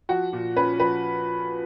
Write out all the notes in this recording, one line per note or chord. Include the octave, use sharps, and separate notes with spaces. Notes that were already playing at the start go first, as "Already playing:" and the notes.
F3 F#4
A#2
C#4 B4
F3 B4